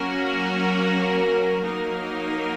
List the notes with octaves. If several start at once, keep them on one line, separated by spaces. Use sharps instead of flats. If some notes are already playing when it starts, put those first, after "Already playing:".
Already playing: F#3 A#3 C#4 F#4 A#4
F#3 A#3 D#4 A#4